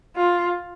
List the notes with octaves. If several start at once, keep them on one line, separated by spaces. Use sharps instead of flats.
F4